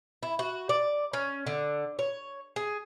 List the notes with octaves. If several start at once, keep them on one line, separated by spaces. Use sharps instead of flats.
E4
F#4
D5
C#4
D3
C#5
G#4